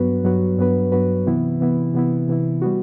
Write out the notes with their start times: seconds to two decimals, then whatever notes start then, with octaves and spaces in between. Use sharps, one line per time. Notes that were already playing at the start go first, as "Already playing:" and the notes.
Already playing: G2 F#3 B3 F#4 B4
0.24 G2 F#3 B3 F#4 B4
0.58 G2 F#3 B3 F#4 B4
0.92 G2 F#3 B3 F#4 B4
1.26 C3 E3 B3 E4
1.60 C3 E3 B3 E4
1.94 C3 E3 B3 E4
2.28 C3 E3 B3 E4
2.62 G3 B3 F#4